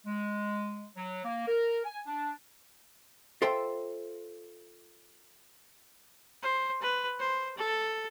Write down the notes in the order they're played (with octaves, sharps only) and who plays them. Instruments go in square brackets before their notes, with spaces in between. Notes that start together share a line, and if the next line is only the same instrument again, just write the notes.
[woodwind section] G#3
F#3
A#3
A#4
G#5
D4
[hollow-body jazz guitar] F4 A4 C5 E5 G5 C6
[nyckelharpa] C5
B4
C5
A4